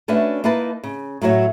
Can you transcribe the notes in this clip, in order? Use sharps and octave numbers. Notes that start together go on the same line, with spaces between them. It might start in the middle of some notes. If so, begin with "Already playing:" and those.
A3 C#4 D4 F#4 B4 E5
A#3 D#4 E4 B4 A5
C#3
A2 F#3 E4 F#4 C#5